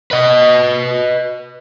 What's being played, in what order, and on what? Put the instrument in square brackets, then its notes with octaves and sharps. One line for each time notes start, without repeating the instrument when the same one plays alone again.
[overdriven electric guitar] B4 D#5